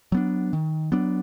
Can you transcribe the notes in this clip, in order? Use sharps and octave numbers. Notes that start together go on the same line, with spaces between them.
F#3 B3 D4
D#3
F#3 B3 D4